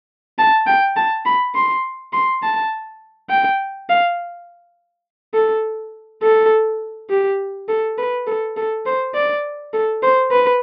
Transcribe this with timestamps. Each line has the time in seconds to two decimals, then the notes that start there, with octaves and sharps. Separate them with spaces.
0.39 A5
0.67 G5
0.97 A5
1.26 B5
1.55 C6
2.13 C6
2.43 A5
3.30 G5
3.89 F5
5.34 A4
6.23 A4
7.10 G4
7.69 A4
7.98 B4
8.27 A4
8.57 A4
8.86 C5
9.15 D5
9.74 A4
10.03 C5
10.31 B4